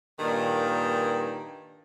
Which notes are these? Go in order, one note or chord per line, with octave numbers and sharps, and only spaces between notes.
G2 A#2 D#3